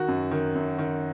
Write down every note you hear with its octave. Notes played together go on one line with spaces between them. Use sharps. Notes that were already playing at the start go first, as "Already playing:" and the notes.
Already playing: D#3 F#4
F#2
D#3
F#2
D#3